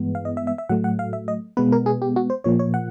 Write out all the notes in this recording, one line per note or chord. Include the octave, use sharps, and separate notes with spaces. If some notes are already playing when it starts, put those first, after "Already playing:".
Already playing: G2 E3 G#3 B3
F5
D#5
E5
E5
E5
A2 F#3 A3 F#5
F#5
F5
E5
D#5
B2 G#3 B3 B4
A#4
G#4
G4
F#4
C5
A#2 F3 A#3 C#5
C#5
F#5